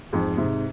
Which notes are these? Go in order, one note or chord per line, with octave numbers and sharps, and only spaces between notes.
F2 G#2
G#2 C3